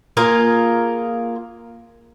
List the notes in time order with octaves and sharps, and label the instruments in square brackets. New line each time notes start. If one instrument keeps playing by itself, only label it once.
[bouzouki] A#3 F4 G#4